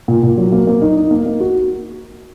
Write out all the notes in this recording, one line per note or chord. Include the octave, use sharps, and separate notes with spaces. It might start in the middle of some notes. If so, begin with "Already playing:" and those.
A#2
A#2
F#3
A#3
A#3
D#4
D#4
A#3
A#3
F#4